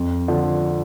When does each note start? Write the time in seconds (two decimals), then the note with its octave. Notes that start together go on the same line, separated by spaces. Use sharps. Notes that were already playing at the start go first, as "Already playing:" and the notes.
Already playing: F2
0.28 D3 F3